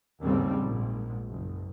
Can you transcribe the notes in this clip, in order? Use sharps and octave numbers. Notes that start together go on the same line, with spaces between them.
D#2 G#2 C#3 G3 A3 C4
A#1 G#2
F#1